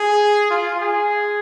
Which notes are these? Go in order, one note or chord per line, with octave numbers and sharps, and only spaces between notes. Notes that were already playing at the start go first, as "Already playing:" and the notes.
Already playing: G#4
F4
G#4